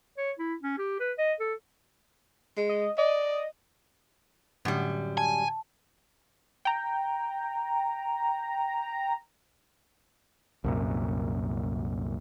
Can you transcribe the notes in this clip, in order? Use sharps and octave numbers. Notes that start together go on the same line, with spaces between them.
C#5
E4
C#4
G4
B4
D#5
A4
G#3
D#5
D5 D#5
F#2 A2 D3 G3
G#5 A5
G5 A#5
C2 F#2 A#2